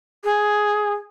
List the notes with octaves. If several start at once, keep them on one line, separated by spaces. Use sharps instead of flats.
G#4